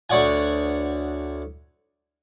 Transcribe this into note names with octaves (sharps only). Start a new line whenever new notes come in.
D2 C#5 D5 F#5 G#5